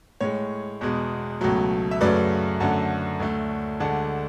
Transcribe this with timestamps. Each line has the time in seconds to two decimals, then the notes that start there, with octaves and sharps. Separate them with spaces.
0.21 A2 G#3 C#5
0.81 E2 B2 G#3
1.41 C#2 B2 F#3 A3
1.91 E5
2.01 F#2 C#3 F#3 A3 B4 D5
2.60 F#2 D3 A3 F#5 A5
3.20 D2 D3 A3
3.80 D2 D3 G#3 F#5 A5